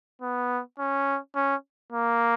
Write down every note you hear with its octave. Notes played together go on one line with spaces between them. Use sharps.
B3
C#4
C#4
A#3